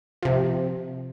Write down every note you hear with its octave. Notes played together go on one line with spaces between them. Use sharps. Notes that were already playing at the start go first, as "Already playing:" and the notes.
C3 F3